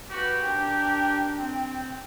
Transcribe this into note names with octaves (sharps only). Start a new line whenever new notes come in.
F#4 G4 B4
D4 A#4 G5
C4